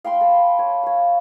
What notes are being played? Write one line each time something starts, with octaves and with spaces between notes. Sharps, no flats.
F5 G5 B5 C6
A4
C#5
C#5 F5